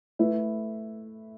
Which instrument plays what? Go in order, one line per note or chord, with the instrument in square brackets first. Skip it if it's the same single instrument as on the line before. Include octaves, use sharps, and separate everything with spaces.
[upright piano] A3 E4 B4